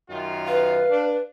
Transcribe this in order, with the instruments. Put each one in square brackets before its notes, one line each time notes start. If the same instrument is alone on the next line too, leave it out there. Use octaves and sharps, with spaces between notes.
[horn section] F#2 D#3 F4
[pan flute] B4 [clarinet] F5
[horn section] D4